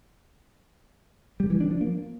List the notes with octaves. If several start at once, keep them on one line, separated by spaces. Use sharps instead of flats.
G3
E3
D4
F3
A#3